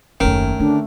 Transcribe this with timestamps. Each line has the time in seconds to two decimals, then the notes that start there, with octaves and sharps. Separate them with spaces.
0.20 F#1 D#2 D#3 A3 C#4
0.60 D3 A3 D4